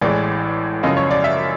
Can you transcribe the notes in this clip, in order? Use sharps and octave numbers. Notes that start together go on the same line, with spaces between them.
A1 A2 E3 G#3 D5
F#2 C#3 F3 D#5
C#5
D5
E5